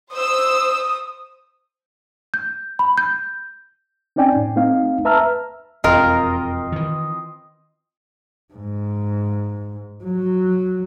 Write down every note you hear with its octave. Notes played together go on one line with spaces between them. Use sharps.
C5 D#6 E6
G6
B5
G6
C4 C#4 D#4 D5 G5 G#5
A2
A3 C4 D#4 F5
B4 E5 A5 A#5 E6 F6
E1 F2 C4 F4 A#4 D#5 C6
D#3 E3
G#2
F#3